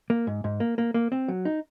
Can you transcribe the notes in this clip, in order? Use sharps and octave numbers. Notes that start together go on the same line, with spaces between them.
A#3
G#2
G#2
A#3
A#3
A#3
C4
F#3
D#4